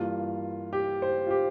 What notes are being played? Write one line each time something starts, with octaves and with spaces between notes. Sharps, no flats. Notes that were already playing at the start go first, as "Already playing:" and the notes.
Already playing: G2 E3 A#3 F4
G4
C5
F4
G4